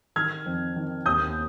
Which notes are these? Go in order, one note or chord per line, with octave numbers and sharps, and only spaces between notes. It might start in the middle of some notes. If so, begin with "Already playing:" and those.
D#3 F6 G#6
F2
D#3
D#2 D#6 G6